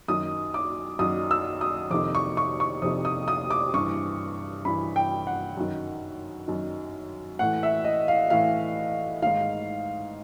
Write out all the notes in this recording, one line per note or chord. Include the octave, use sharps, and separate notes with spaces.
F#2 D#3 D#6
D6
F#2 D#3 D#6
E6
D#6
F2 C3 D#3 D6
C#6
C#6
C#6
F2 C3 D#3 D#6
D#6
D#6
D6
G2 E3 C#6
G2 E3 B5
G5
F#5
F#2 D#3
F#2 D#3
A2 E3 F#5
E5
D#5
F5
A2 E3 F5
G#2 D#3 F5